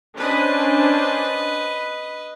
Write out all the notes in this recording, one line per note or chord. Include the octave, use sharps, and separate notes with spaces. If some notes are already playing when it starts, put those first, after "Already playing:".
C#4 D4 B4 C5 D#5